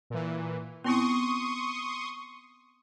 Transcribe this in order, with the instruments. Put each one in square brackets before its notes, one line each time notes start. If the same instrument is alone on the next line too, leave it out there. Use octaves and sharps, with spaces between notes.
[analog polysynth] A#2 E3
[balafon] B3 C4 E4 [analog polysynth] C6 C#6 D#6